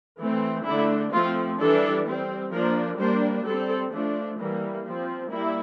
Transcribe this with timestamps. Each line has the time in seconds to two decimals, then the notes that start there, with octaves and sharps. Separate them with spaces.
0.18 E3 A3 C4
0.65 D3 A3 D4 E4
1.12 F3 A3 C4 F4
1.59 E3 G3 D4 A4
2.05 G3 C4
2.52 F3 A#3 D4 A#4
2.98 G3 A#3 D4 C5
3.45 G3 C4 A4
3.92 F3 A3 D4
4.38 E3 G3 A#3
4.85 F3 C4
5.32 G3 A#3 E4